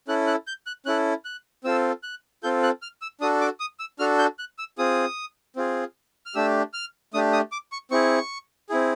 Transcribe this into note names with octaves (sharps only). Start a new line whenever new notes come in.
C#4 E4 A4 F#6
F#6
G6
F#6
C#4 E4 A4 F#6
F#6
C4 F4 A4 E6
F#6
C4 F4 A4 G6
F#6
F6
E6
D4 F#4 A4 D#6
D6
D#6
E6
D4 F#4 A4 F6
G6
F#6
E6
C4 F4 G#4 D#6
C4 F4 G#4
F6
A3 D4 G4 E6
F6
A3 D4 G4 D#6
D#6
D6
C#6
C4 E4 G#4 C#6
C4 E4 G#4